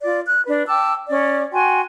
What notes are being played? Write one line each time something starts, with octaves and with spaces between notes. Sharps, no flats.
F4 D5
F#6
D4 B4
G5 A5 D6 E6
C#4 D5
F#4 G5 G#5 C6